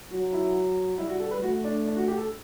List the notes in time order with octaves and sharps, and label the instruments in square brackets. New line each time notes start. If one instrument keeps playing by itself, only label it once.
[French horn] F#3 [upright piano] F#4
[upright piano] E4
[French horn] G3 [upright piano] E4
[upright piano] F#4
A4
B4
[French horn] A3 [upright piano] F#4
[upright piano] D4
D4
F#4
G4
A4